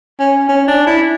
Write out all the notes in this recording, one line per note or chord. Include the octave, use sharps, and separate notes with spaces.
C#4
C#4
D4
E4